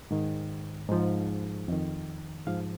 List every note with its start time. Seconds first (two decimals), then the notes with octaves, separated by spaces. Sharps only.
0.11 G#2 D#3
0.89 G#2 F3
1.68 F2 D#3
2.47 G#2 F3 F5